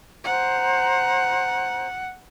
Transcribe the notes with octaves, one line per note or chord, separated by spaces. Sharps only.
C5 F#5 A#5